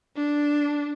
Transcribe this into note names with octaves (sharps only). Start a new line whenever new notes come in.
D4